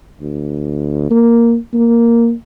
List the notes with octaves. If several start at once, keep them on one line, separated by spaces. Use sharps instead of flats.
D2
A#3
A#3